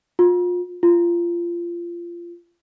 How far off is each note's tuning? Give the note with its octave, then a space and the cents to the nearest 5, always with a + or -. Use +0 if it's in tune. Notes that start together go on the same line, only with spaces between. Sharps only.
F4 +30
F4 -20